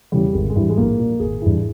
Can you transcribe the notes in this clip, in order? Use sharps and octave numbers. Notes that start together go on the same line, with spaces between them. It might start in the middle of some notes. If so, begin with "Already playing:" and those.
E2 C#3 G3
G#1 G#3
G#3
G2 E3 G3
G#3
A#1 A#3
A#2
G#1 G#4
G2 E3